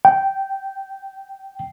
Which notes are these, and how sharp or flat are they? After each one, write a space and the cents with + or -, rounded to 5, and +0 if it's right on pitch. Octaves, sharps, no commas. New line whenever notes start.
G5 -10